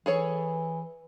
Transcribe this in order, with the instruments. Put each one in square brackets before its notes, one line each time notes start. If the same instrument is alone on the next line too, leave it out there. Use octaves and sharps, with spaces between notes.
[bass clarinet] E3 [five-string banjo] G#4 A4 C#5